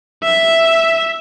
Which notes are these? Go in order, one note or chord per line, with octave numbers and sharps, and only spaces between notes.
E5